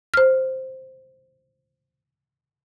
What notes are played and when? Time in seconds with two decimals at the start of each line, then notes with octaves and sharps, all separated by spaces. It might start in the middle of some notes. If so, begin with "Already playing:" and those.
0.14 C5 F6